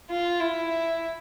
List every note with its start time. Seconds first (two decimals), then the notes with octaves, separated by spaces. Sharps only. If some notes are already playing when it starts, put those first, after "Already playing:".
0.10 F4
0.40 E4